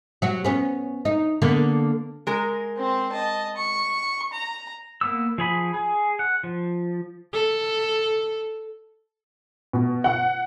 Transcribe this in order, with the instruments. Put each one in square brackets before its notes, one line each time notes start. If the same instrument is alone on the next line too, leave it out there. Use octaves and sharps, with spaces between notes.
[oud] F#3 F#4
B3 C#4
D#4
D3 A#3 B3
[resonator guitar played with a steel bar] G#3 A#4
[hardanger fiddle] C4 C5
D#5 A5
C#6
A#5
[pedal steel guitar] A#3 B3 E6
F3 G#4 B5
G#4
F#5
F3
[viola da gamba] A4
[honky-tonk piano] B2
F#5